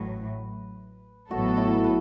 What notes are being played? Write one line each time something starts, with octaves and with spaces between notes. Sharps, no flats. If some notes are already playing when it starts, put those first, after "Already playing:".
Already playing: A1 A2 F#3 B4
A1 A2 F#3 B3 F#4 A4
E4
B4